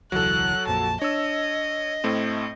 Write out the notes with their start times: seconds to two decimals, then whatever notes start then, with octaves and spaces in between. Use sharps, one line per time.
0.12 E1 C#2 E3 F#3 A4 F#6
0.67 A#1 F2 A#2 A5
1.02 D4 C#5 D#5 E6
2.04 A2 A3 C4